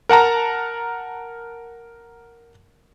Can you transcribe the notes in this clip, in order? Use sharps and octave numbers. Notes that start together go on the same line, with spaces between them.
A#4 F#5 A5 A#5